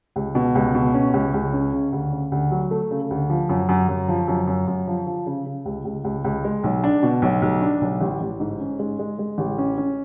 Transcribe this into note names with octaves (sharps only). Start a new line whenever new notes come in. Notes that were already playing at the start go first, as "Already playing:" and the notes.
C#2
B2
C#2
B2
C#4
C#2
C#2
C#4
C#3
D2
C#3
D2
F#3
A3
C#3
D2
F3
F#2
F#2
F#2
F3
F#2
F#2
F#2
F3
F3
C#3
C#3
C#2
C#2
C#2
C#2
G#3
B1
D4
B2
B1
B1
D4
B1
A1
A1
G#2
C#4
G#3
G#3
G#3
A1
C#4
C#4